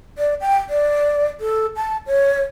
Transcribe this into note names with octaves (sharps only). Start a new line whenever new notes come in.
D5
G5
D5
A4
A5
C#5